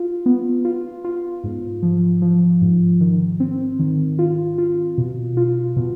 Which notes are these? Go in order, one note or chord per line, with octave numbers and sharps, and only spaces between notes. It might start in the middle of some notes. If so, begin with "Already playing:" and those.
Already playing: F4
B3
F4
F4
G#2
F3
F3
G#2
D#3
C4
D#3
F4
F4
B2
F4
B2